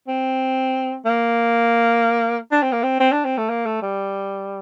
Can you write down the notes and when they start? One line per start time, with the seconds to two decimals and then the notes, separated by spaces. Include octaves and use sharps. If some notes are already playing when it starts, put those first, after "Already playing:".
0.08 C4
1.05 A#3
2.52 D4
2.63 C4
2.72 A#3
2.83 C4
3.00 C4
3.12 D4
3.25 C4
3.38 A3
3.50 A#3
3.66 A3
3.82 G3